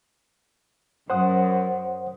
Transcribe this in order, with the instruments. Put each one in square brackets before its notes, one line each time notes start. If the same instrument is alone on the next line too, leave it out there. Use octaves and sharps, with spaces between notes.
[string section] F#2 [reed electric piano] C5 F#5 D#6